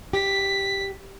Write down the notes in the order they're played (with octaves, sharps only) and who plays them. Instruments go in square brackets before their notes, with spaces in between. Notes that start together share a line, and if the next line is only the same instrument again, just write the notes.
[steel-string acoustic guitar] G4 [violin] B6